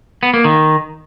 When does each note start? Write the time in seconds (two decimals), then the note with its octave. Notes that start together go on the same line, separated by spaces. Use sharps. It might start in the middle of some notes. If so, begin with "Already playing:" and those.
0.23 B3
0.34 A#3
0.44 D#3